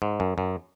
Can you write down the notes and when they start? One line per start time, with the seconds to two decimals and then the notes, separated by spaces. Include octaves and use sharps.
0.02 G#2
0.20 F#2
0.38 F#2